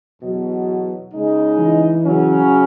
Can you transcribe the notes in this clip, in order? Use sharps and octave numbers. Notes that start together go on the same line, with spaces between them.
E2 B2 F#3
C#3 G#3 D#4
E3
C#3 F#3 C#4